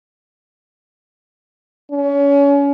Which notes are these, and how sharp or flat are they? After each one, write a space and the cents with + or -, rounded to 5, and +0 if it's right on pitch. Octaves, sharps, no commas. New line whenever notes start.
C#4 +30